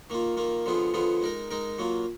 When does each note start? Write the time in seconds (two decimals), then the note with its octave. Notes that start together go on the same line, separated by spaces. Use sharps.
0.10 D#3 A#3 F4
0.37 D#3 A#3 F4
0.66 D3 F3 B3 F4 G#4
0.94 D3 F3 B3 F4 G#4
1.22 G#3 D#4 A#4
1.51 G#3 D#4 A#4
1.79 F#3 A#3 F4